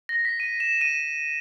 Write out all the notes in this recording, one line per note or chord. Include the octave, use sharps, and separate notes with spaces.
A#6
B6
D#7
E7
D#7